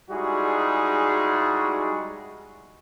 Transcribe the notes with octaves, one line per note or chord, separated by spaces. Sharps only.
G3 G#3 D#4 E4 F#4 G#4